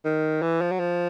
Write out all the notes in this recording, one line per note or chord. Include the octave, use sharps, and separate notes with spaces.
D#3
E3
F3
F#3
F3